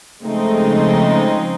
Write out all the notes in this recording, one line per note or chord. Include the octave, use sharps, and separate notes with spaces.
C#3 F3 G#3 A3 C4 D#4